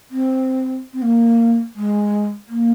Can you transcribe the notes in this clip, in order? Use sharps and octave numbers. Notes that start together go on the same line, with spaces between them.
C4
C4
A#3
G#3
A#3